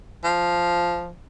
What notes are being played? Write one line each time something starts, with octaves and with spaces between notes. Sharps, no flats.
F3